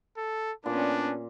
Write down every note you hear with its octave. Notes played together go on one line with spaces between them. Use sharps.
A4
A#2 B3 C#4 D4